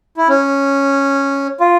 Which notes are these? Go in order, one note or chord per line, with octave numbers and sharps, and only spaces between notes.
E4
C#4
F4